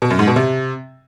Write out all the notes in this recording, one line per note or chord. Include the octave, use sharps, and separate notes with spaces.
B2
F#2
G#2
B2
C3